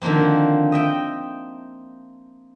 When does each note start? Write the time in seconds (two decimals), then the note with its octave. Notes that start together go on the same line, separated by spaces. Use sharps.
0.02 D3 D#3 F3 A#3 C4
0.72 D#5 E5 G5